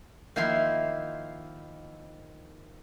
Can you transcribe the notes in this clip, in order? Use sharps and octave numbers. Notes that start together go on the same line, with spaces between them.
D#3 F3 A#3 E4 F5 C6